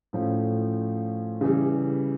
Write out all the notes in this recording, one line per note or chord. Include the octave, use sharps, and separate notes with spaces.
A2 F3 A3 C#4
C#3 E3 G3